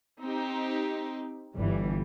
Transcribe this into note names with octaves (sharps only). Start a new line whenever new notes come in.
C4 D#4 G4
G1 E3 G3